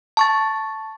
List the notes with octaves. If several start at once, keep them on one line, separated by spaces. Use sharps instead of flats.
A5 C#6 A6